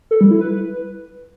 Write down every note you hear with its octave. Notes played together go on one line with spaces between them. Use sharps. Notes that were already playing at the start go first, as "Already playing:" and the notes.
A4
G3
E4
B4